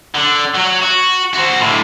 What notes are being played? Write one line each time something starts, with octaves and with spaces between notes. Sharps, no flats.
D3
F#3
F#4
F#4 C5
A2 D3